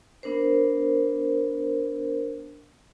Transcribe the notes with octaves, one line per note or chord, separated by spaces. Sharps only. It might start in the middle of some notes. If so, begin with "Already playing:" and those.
B3 D4 A#4 C5